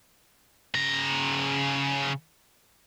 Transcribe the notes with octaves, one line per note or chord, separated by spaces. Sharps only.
C#3 A#5